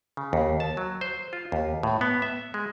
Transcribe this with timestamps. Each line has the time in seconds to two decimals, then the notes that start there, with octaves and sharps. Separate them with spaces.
0.17 C#3
0.33 D#2
0.60 A5
0.77 F#3
1.01 C5
1.33 F4
1.52 D#2
1.83 A2
2.01 B3
2.22 E5
2.54 G#3